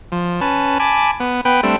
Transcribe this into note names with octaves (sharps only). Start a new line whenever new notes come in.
F3
C#4 B4 A5
G#5 A5 B5 D6
B3
B3 B4 G5
G3 A3 C4 D4